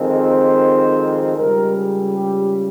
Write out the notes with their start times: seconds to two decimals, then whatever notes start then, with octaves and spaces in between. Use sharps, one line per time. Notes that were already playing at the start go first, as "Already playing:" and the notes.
Already playing: F2 D#3 G#3 C4
0.21 C5
1.37 C#2 C#3 G3 A#4
1.75 G#4
2.14 G4